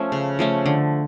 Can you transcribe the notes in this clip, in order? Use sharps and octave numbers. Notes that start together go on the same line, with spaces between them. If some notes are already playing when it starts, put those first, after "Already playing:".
Already playing: F3 A3 C#4
C#3
F3 A3 C#4
D3